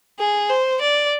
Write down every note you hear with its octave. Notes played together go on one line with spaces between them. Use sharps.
G#4
C5
D5